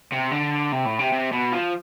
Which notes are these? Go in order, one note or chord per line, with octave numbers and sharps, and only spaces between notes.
C3
D3
C3
A2
C3
C3
B2
F3